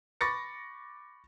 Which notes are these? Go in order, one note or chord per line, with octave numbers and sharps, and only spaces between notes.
B5 C#6 D6 A6 A#6 C#7